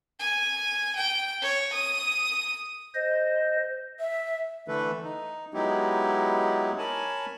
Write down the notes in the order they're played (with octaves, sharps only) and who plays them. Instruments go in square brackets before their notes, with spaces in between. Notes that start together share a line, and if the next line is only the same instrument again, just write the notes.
[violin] G#5
G5
C#5
D#6
[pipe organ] C5 D#5
[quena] E5
[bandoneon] D3 E3 A3 A4 B4
D#4
F#3 G#3 B3 D#4 E4 G4
A#4 C#5 G#5 A5 B5